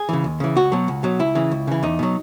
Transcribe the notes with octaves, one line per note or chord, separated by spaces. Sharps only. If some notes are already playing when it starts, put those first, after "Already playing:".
Already playing: G#4
C#3 E3
D#2
C#3 E3
C#2 F#4
B2 F#3
C#2
B2 F#3
C#2 E4
C#3 E3
C#2
C#3 E3
E2 D#4
B2 F#3